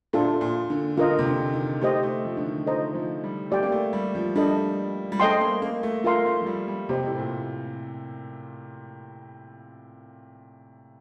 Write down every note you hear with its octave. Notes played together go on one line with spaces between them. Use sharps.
A#2 D4 F4 A4
A#2
D3
D3 F4 A#4 D#5
C3
D3
D#3
A3 G4 C5 D#5
A3
F3
D3
D#3
F3 A4 C5 D#5 A#5
F3
G3
A3 G4 D5 G5
A#3
A3
G3
F3
G3 D4 A4 D#5
G3
A3 A4 D#5 G5 C6
A#3
A#3
A3
A3 F4 A#4 F5 C6
A3
F3
G3
G3
C3 G4 C5 D#5
A2
A#2